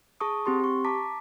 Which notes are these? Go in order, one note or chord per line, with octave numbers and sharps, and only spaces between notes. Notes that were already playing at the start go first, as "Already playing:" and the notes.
G#4 A5 C#6 D#6
C4 G4 C6
G4 C#6
A5 A#5 D6 B6